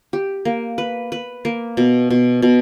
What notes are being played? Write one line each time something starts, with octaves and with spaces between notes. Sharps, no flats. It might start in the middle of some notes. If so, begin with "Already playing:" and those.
G4
A#3
B4
B4
A#3
B2
B2
B2